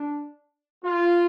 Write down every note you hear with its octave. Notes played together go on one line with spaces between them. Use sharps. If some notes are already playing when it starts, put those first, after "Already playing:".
Already playing: D4
F4